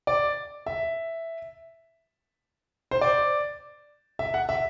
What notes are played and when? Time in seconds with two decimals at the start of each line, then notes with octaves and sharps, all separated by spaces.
0.07 D5
0.66 E5
2.91 C5
3.01 D5
4.19 E5
4.34 F#5
4.49 E5